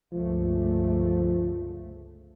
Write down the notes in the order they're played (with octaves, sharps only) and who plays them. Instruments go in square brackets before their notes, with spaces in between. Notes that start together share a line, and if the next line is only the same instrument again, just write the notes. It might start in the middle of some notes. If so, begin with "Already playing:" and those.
[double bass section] G1 C#2 A3 [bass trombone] F3